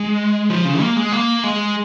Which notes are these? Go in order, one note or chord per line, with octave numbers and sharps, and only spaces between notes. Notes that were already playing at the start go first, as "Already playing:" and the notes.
Already playing: G#3
F3
C#3
A#3
G#3
A#3
G#3